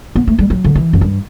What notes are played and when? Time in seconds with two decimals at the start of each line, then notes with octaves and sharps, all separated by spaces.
0.16 B3
0.27 A3
0.39 G3
0.50 F#3
0.64 D3
0.75 E3
0.93 F#2
1.01 G2